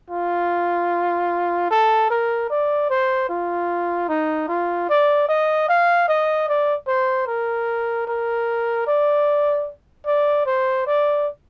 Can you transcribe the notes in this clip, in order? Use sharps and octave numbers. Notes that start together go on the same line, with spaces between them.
F4
A4
A#4
D5
C5
F4
D#4
F4
D5
D#5
F5
D#5
D5
C5
A#4
A#4
D5
D5
C5
D5